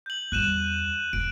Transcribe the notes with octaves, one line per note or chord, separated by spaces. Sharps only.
G6 F#7
E2 G3 F#6 D#7 E7
E1 D7